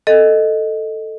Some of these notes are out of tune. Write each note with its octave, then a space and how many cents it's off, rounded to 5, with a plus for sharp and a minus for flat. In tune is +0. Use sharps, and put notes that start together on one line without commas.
A4 +5 D#5 +0